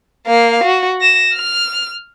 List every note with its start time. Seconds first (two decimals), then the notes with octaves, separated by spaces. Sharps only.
0.26 A#3 F5
0.64 F#4
1.01 A#6 E7
1.34 F6